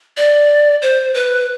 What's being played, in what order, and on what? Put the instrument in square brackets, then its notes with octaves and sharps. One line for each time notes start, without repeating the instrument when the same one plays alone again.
[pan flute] D5
C5
B4